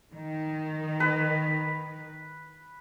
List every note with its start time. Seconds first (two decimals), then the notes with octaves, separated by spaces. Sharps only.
0.14 D#3
1.00 B4